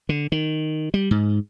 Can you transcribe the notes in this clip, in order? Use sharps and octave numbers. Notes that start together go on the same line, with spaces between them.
D3
D#3
G3
G#2